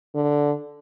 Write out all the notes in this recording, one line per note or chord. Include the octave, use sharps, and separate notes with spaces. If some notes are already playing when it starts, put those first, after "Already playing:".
D3